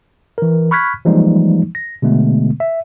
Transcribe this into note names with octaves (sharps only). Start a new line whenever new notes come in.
E3 A#4
B5 C#6 F6 F#6 G#6 B6
E3 F3 G3 G#3 A#3 D#4
A#6
B2 D3 G#3 A3 B3
E5